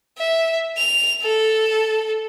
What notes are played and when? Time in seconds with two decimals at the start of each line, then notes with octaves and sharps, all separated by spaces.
0.18 E5
0.77 F7
1.22 A4